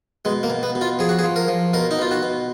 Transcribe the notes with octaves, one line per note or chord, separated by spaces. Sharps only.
B2 G#3
A#3
B2
B3
B2
F4
F3 G#4
F#4
G#4
F3
A#4
F3
B2 A#4
D#4
B2 F4
F#4
B2